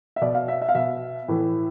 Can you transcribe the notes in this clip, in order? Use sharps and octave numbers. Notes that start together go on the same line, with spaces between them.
E5
B2 D5
F5
E5
E5
F5
B2 E5
A2 E3